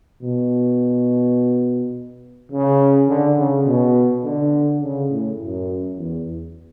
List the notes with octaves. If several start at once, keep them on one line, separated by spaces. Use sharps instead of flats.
B2
C#3
D3
C#3
B2
D3
C#3
A2
F#2
E2